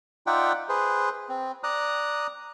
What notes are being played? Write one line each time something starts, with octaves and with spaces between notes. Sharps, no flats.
D#4 F4 D5 E5 F#5 G5
G#4 B4 C5
C4
D5 A#5 D#6 F#6